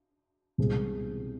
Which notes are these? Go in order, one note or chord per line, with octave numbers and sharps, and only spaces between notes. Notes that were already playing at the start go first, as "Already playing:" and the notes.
C2 B2 G#3 C4 G#4